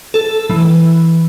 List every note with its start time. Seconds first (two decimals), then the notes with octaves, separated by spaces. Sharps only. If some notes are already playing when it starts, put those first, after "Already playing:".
0.14 A4
0.50 E3